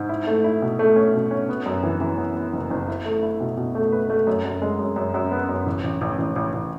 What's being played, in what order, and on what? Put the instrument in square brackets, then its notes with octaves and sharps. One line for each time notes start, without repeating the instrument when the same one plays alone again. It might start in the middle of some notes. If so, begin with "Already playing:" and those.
Already playing: [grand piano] G#2
E4
A3
E4
B2
A3
C#4
B2
C#4
B3
F#2
E3
E3
B3
B3
F#1
F#1
E4
A3
E4
B2
B2
A3
B4
A3
F#2
F#2
G#3
F#2
F#2
F#2
B3
F#2
A1
A1
A1
A1
A1
A1